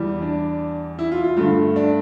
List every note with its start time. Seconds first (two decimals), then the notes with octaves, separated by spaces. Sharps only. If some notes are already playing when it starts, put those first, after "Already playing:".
Already playing: E2 E3 G3
0.22 D4
0.99 E4
1.11 F4
1.24 F4
1.37 G2 D3 A3 F4
1.76 D4